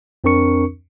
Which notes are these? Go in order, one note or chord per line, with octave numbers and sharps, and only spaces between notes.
F2 C4 D4 A#4 C#6 C#7